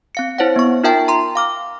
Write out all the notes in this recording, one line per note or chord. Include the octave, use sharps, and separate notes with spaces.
C4 F5 C#7
E4 C5 C#5 F5 F#5
B3 C#6
D#4 F4 A#4 E5 G5 A5
A#5 C6
F5 D6 F6